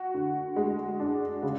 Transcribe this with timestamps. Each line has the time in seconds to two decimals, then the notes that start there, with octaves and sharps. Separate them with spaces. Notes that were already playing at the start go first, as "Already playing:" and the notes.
Already playing: F#4
0.14 D3
0.56 G#3
1.00 D4
1.43 C#3